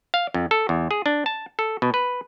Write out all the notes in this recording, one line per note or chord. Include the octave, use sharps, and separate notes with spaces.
F5
F2
A4
E2
G#4
D4
A5
A4
B2
B4